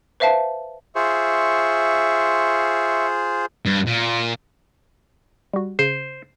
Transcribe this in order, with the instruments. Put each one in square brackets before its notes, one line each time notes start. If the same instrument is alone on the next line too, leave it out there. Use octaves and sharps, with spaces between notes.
[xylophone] B4 C5 E5 F5 A5
[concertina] F4 G#4 C5 [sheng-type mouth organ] E5 C#6
[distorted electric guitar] G2
A#2
[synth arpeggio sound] G3 F#4
[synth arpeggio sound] C#3 [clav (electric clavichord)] C5